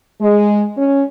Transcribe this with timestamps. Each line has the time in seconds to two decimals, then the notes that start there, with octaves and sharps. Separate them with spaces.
0.21 G#3
0.78 C#4